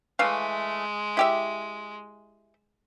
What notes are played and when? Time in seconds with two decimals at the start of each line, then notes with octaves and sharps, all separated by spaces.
0.19 E3 G#3 A3 F5
1.17 E4 G4 E5